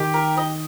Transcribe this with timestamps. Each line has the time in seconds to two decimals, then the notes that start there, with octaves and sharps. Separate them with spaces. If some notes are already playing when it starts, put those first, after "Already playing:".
Already playing: D#3 G4
0.14 A#4
0.37 D#5